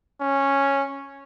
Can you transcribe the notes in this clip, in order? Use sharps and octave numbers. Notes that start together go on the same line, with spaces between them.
C#4